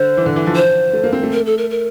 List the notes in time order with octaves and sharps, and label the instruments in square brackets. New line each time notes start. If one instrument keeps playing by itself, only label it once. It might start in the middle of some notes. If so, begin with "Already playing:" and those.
Already playing: [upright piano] D3 [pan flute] C5
[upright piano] E3
D3
E3
F3
[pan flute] C5
[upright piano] A3
A#3
C4
A3
[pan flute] A#4
A4
A#4
A#4